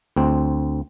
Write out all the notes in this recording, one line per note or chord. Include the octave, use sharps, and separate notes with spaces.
D2 C4